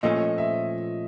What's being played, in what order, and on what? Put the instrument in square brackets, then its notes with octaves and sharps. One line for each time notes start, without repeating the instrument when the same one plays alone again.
[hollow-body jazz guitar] A#2 F3 A3 C#4 [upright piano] D#5
[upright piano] E5